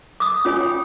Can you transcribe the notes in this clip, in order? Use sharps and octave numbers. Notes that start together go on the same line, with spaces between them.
D6 D#6
C#4 F4 C#5 G#5 D#6
G5